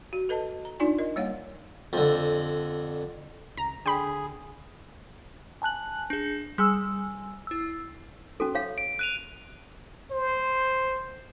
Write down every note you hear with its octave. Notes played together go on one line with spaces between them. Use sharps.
F#4
A4 B4 D#5 A5
A#5
D4 D#4 F4 D5 G#5 C#6
A#4 D#5
G3 A#3 C#5 F5 F#5
F2 D3
C#2 A#5
D3 G#4 G5 B5
G#5 A5 F#6 F#7
D4 G#4
G3 G#4 G#5 E6
E4 E6
C#4 F#4 A4
C#5 F5
D7
F#6 D#7 F7
C5